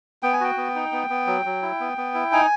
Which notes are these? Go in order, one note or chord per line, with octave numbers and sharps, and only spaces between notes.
B3 G5
G#5
F#4 G5
B3
D#4
B3
B3
F#3
F#3
E4
B3
B3
E4
D#4 G#5